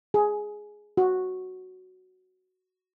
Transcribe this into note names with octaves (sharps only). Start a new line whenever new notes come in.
G#4
F#4